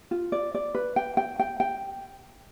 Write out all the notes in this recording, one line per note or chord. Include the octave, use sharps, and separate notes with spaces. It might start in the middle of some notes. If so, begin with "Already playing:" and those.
F4
D5
D5
B4
G5
G5
G5
G5